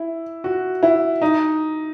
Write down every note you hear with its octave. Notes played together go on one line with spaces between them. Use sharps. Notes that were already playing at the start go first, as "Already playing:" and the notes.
Already playing: E4
F#4
E4
D#4